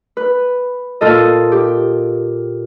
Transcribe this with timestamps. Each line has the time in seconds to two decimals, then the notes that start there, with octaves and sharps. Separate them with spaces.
0.17 B4
1.01 A#2 F4 A4 D#5
1.52 G4